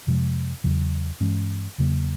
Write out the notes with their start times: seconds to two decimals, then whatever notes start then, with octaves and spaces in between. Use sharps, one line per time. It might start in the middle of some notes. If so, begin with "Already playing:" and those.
0.07 F2 C3 F3 G#3
0.64 E2 C#3 F#3
1.20 G2 E3 G#3 C#4
1.78 E2 C#3 F#3 A#3